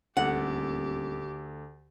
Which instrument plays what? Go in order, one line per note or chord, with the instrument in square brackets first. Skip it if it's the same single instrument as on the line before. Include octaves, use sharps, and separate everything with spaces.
[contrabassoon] D#1 [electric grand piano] D2 A4 [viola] G4 [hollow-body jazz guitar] F#5